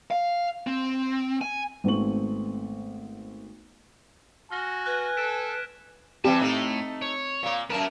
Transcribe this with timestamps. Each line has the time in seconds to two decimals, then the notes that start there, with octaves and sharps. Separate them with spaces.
0.11 F5
0.67 C4
1.41 G#5
1.84 G#1 A3 B3 C4 C#6 F#7
4.51 F#4 G#5 F6 A#6 G7
4.86 B4 F#6 G#6 A#6
5.17 A4 B6 D7 E7
6.25 E3 G3 C4 G4 A5
6.42 A2 A3 D#4
7.02 C#5
7.43 A#2 A#3
7.70 F#2 A2 B3 A#4 A5